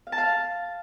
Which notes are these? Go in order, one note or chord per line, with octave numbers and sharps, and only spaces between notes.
F5
A5
F5